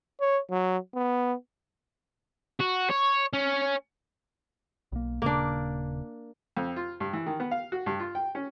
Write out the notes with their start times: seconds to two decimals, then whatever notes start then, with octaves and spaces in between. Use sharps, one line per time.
0.21 C#5
0.50 F#3
0.95 B3
2.60 F#4
2.91 C#5
3.33 C#4
4.92 B1 A#3
5.22 D#1 C#3 A#3 D4
6.57 F2
6.76 F4
7.00 G2
7.13 E3
7.26 D#3
7.40 B3
7.51 F5
7.72 F#4
7.86 G2
8.00 F4
8.15 G5
8.35 C#4